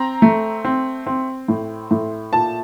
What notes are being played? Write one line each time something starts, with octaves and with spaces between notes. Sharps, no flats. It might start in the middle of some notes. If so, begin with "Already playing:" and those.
Already playing: C4 A#5
A3
C4
C4
A2
A2
A#2 A5